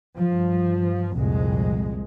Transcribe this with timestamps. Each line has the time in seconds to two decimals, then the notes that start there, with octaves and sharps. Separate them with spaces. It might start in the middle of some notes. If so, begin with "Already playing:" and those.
0.17 G2 F3
1.14 C2 F2 A#2 G#3